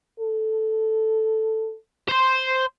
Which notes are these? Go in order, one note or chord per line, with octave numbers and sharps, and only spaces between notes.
A4
C5 C6